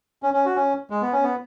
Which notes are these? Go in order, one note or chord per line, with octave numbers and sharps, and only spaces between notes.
C#4
C#4
F#4
C#4
G#3
B3
C#4
B3